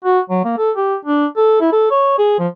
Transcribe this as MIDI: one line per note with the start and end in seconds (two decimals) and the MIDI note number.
0.05 0.20 66
0.30 0.41 54
0.44 0.55 58
0.58 0.71 69
0.76 0.96 67
1.05 1.26 62
1.37 1.56 69
1.61 1.68 64
1.73 1.90 69
1.91 2.15 73
2.18 2.38 68
2.39 2.48 53